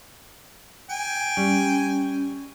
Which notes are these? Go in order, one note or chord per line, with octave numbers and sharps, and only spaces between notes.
G5 G#5
G3 C#4